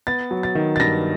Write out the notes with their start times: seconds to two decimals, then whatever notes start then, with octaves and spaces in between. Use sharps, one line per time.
0.07 B3 A6
0.31 F#3
0.43 A6
0.55 D#3
0.76 A6
0.80 G2 A#6